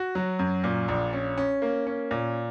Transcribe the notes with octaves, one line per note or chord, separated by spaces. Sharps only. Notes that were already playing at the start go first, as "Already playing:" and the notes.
Already playing: F#4
F#3
F#2
A#2
A#1
C#4
C#4
A#3
C#4
A#2